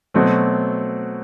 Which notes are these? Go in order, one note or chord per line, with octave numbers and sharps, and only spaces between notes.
B2 F#3 A3 C4